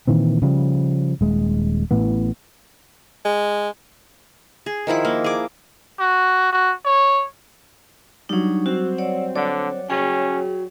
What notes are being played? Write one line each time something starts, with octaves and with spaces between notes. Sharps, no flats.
A#2 D#3 E3 C4
C#3 F3 G3
D#1 G#3
A1 A2 E3 B3
G#3
G#4
D#3 F3 E4 B5
A#3
G#4 D6
F#4
F#4
C#5
F#3 G3 D4 D#4
C4 F#4
C#5 D5 F#5
D3 C#5 D5 F#5
C#4 F#4 G#4 C#5 G5